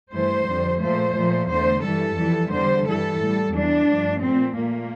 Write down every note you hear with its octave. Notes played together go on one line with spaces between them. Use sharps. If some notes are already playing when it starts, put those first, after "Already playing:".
G2 E3 A3 C5
F2 D3 G3
A#2 F3 A3 C5
A#2 F3 A3
E2 D3 A3 C5
G2 E3 G3 A4
F2 E3 G3
E2 D3 G3 C5
G2 E3 G3 A4
A2 G3
E2 E3 G3 D4
G2 F3 A3
A#2 A3 C4
A#2 A3 A#3